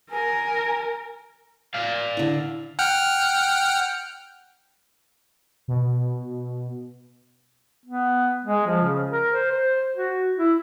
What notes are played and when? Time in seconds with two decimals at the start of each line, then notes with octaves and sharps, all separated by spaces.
0.11 A#4 G#5
1.75 D5 F5
2.17 D3 E4
2.79 F#5 G5 F6
5.68 B2
7.85 B3
8.44 G#3
8.67 F3
8.82 C#3
9.11 A#4
9.30 C5
9.52 C5
9.95 F#4
10.37 E4